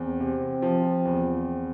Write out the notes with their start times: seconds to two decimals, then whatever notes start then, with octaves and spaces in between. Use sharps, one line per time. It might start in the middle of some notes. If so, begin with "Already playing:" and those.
Already playing: E2 C4
0.20 C3
0.62 F3
1.05 E2